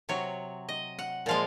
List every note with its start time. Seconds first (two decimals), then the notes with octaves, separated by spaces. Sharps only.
0.09 C3 F#3 C#5
0.69 D#5
0.99 F#5
1.26 A#2 F3 G#3 F5